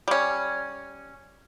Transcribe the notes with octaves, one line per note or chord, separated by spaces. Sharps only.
G3 C#4